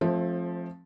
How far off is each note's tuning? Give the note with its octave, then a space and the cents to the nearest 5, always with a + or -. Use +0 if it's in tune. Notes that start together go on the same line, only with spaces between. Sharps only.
F3 +0 A3 -20 C4 +25